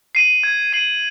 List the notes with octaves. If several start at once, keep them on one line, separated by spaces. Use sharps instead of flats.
C7 D#7 F#7
G#6
C7 D#7 F#7